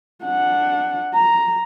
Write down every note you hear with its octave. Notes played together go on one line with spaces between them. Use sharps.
D4 F#5
A#5